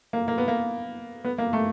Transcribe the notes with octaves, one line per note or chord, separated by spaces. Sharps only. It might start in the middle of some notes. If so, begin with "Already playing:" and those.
A#3
A#3
B3
A#3
B3
A#3
A3